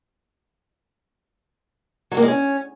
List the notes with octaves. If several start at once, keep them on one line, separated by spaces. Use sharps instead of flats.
F#3
A#3
G#3
C#4